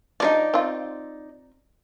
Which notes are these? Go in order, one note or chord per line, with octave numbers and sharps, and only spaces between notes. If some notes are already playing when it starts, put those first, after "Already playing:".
F3 D4 D#4 F#4 D5
C4 F4